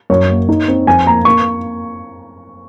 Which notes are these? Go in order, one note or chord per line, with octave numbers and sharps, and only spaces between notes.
F#2 C#5
A#3
D#4
C4
F2 G#5
A#3 A#5
A#3 C#6